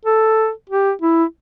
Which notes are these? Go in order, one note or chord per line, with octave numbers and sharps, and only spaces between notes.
A4
G4
E4